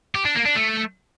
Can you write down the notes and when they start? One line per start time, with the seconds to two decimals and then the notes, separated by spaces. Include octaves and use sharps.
0.15 G4
0.25 D4
0.35 A#3
0.45 D4
0.55 A3